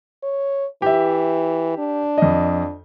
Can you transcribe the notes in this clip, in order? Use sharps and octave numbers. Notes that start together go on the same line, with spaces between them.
C#5
E3 G4 E5
D4
F2 D#5